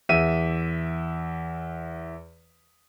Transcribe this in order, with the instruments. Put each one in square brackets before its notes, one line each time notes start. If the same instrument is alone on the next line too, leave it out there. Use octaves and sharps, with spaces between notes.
[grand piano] E2 E5 B6 D#7